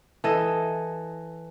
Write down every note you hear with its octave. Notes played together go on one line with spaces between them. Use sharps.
E3 A4 D#5